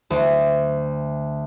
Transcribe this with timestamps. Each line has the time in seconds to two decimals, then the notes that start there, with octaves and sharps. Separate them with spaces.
0.10 D2